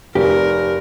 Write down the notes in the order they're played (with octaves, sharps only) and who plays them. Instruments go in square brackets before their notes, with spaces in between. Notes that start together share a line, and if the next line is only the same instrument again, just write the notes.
[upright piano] F1 [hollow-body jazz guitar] G4 [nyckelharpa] A#4